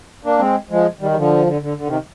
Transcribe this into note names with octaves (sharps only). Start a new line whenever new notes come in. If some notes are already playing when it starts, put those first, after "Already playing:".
A#3 D4
G#3 C4
F3 G#3
D#3 G3
G3
D3 F3
D3
D3
D3
C3 D#3